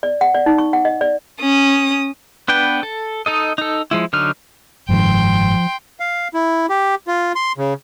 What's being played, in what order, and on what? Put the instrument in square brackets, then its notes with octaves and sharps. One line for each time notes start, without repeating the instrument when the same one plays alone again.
[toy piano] D5
F#5
D5
D#4
C#6
F#5
D#5
D5
[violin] C#4 D#6
[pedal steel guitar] B3 D4 B4 G5
A4
D#4 A4 D#5
D#4 A4
F3 G#3 E4
D3 F#3 D#4 F6
[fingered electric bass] F#1 G#2 D#3 [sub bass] F3 [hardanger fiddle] G5 C6
[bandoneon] F5
E4
G4
F4
C6
C#3